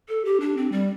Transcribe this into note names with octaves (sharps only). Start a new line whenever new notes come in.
A4
G4
D4
C4
G3